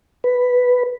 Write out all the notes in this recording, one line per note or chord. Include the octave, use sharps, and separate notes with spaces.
B4